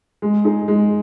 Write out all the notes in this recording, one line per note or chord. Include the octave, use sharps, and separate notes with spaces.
G#3
D#4 G#4
G#3